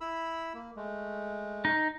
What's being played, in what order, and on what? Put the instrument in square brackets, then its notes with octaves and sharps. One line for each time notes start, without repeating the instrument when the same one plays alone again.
[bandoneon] E4 B5 E6
A#3
G#3 A3
[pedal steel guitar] D#4